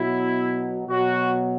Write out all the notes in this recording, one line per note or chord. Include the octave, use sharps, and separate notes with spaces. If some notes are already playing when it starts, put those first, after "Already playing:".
Already playing: B2 F#3 E4
B2 F#3 F#4